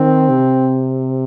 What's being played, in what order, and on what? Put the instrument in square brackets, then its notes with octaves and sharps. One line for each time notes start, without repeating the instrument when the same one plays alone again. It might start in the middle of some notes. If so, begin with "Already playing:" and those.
Already playing: [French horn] D#3 [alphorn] C4
[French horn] C3